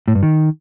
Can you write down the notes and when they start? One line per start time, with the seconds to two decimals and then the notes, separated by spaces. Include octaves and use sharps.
0.08 A2
0.15 G2
0.23 D#3